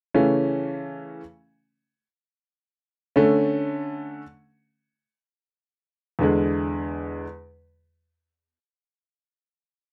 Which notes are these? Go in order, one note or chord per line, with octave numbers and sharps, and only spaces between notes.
C#3 E3 A3 C#4
D3 A3 C#4
E2 D3 G#3